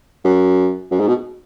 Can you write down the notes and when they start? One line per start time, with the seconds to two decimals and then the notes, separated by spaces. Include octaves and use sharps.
0.25 F#2
0.91 F#2
1.00 G#2
1.08 B2